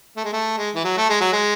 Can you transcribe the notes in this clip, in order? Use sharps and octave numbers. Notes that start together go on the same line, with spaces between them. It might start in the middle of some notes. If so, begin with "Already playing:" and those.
A3
G#3
A3
G#3
E3
F#3
A3
G#3
F#3
G#3